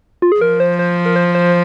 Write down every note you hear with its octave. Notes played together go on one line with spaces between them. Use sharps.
F4
G#4
F3 A#4
C5
C5
A#4
C5
C5